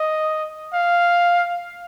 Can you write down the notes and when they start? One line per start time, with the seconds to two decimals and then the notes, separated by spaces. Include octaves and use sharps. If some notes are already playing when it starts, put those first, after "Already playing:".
Already playing: D#5
0.73 F5